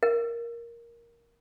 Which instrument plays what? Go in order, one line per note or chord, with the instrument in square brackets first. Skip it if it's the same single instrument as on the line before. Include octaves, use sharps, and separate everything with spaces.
[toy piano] A#4